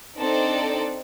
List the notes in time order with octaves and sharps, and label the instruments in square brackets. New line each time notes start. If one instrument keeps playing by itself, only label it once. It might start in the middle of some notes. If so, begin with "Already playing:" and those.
[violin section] C4 D4 D#4 A4 C5 D5